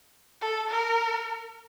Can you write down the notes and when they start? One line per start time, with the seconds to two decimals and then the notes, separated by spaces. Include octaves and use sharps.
0.41 A4
0.69 A#4